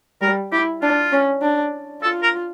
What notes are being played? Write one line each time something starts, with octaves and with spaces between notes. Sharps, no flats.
G3 A#4
E4 G4
D4 F4
C#4
D4
F4 A4
A#4